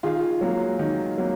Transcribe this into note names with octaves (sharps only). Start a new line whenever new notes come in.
D#3 F4 G#4
F#3 A#3
D#3
F#3 A#3